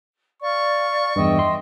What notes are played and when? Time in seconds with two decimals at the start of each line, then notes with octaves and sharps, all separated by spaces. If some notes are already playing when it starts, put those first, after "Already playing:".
0.42 D5 F5 C#6
1.16 E2 G2 D#5 E5 G5
1.39 C6